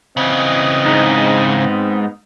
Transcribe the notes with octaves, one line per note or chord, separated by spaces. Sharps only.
C#3 E3 C4 D#5
G#2 D#4
B3